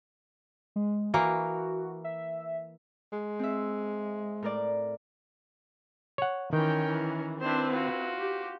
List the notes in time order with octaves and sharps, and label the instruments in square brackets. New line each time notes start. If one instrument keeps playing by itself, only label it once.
[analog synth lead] G#3
[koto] E3 A#3 [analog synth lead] F#4
[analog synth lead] E5
[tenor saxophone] G#3
[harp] C4 E5
A2 A#4 D5
[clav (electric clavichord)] C#5 F#5
[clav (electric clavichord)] D#3 [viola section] E3 G5 [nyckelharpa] C#4 A#4
[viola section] E3
[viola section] C4 E4 B4 [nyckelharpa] D4 C5
[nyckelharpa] F4 F#4
[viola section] G4